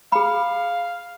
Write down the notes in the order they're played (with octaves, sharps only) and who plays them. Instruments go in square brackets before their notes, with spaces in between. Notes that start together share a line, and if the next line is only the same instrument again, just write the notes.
[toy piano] G#4 B5 [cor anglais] F5